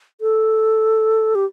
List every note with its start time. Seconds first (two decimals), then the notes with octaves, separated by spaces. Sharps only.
0.21 A4
1.35 G4